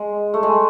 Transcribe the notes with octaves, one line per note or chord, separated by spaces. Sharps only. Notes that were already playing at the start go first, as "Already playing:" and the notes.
Already playing: G#3
A3
G#3